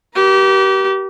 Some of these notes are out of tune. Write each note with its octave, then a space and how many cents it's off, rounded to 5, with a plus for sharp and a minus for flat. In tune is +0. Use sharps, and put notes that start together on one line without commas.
G4 -30 A#4 +40